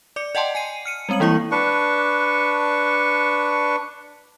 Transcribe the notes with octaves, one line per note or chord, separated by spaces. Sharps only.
D5 D6 C#7
D5 D#5 F#5 G5 A5 C6
G#5 C7 D#7
F6 C#7 D#7
G3 G#3 C4 D#7 F#7
E3 A#3 E4 F5 C#6
D4 B4 C#6